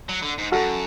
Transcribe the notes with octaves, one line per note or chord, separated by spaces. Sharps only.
F#3
D3
G#2
F#2 F#4 A4